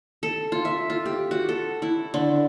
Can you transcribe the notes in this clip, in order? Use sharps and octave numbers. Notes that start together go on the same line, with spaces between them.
A4
F4
E5
F4
G4
F#4
A4
E4
D3